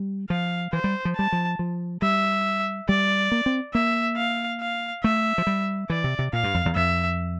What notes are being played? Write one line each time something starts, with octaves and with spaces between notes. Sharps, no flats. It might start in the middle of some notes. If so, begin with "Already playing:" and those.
Already playing: G3
F3 F5
E3 C5
G3
F3
G3 A5
F3
F3
G3 E5
G3 D5
A#3
C4
A#3 E5
F5
F5
A3 E5
F3
G3
E3 D5
C3
C3
A#2 F5
G2
F2
E2
F2 E5